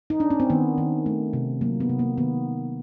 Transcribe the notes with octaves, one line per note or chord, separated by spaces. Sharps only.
D#4
D4
C#4
C4
D#3 B3
D#3
A3
C3
F#3 A#3
B3
C3
A#3
D#3 B3